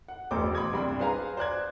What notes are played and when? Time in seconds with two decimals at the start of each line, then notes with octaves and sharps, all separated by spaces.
0.08 F#5
0.31 E1 A1 C5 D6
0.55 B5 C6 D6 D#6 G#6
0.73 C2 G2 B5 C6
0.99 G#4 B4 C5 F5 G#5 A#5
1.37 C5 D5 F#6 G#6